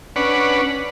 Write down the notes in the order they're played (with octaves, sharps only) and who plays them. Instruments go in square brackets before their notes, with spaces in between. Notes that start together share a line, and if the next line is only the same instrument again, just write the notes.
[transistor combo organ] C#4 D4 B4 F#5